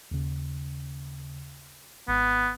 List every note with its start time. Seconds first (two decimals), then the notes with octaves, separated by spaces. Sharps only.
0.11 D#2 C#3
2.08 G#1 B3